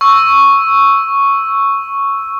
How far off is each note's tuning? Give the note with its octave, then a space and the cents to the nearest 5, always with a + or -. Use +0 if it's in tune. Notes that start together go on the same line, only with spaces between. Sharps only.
C#6 +0 E6 +0